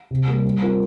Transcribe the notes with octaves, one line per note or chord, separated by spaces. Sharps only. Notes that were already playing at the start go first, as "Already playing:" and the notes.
C3
G3 A#3
G3
C4 F4 A#4